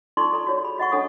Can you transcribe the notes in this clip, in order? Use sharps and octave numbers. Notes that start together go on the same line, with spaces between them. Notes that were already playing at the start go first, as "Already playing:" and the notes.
D#4 F4 A4 D5 C6 C#6
A4 D5 A#5
F#4 C#5
G#4 B5
F#4 D#5 F#5 C#6
D4 A4 C#5 F#5 D#6